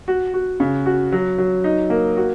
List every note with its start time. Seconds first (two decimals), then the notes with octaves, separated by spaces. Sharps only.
0.08 F#4
0.34 F#4
0.60 C#3
0.86 F#4
1.12 F#3
1.38 F#3
1.64 D#4
1.90 A#3
2.17 F#4